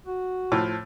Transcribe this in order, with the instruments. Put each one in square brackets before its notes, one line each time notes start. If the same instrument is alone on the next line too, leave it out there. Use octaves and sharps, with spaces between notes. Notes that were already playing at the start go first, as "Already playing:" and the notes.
[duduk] F#4
[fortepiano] A2 F3